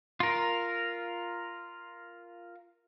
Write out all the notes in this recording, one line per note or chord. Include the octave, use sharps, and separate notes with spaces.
F4 A#4